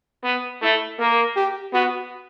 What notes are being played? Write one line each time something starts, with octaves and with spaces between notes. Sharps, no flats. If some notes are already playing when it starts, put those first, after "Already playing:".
B3
A3 E4
A#3 A#4
G4
B3 F#4